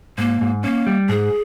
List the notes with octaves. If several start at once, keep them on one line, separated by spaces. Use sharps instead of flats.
G#2 A#3
G#2
A#3 C#4
G3
G#2 G#4